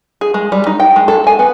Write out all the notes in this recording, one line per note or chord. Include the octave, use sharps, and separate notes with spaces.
G#4
G#3
G3
D#4
G5
G#3
A4
G#5
B3